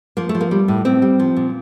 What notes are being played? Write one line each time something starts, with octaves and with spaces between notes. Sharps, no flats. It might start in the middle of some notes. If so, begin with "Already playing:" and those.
F3 A#3
A3
F3
A#3
G3
A2
A2 C4
G3
F3
A#2